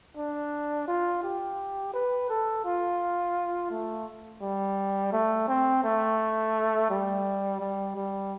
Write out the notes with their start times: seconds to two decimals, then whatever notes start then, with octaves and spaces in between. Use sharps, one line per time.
0.17 D4
0.88 F4
1.23 G4
1.94 B4
2.29 A4
2.65 F4
3.70 A3
4.42 G3
5.12 A3
5.48 C4
5.84 A3
6.90 G3
7.60 G3
7.96 G3